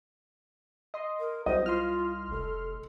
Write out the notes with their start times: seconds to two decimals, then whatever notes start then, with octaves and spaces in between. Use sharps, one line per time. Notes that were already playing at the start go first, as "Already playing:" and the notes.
0.94 D#5 C6
1.20 A#4
1.46 C2 F#3 C5 D#5
1.66 F4 C6 F6
2.31 F1 A4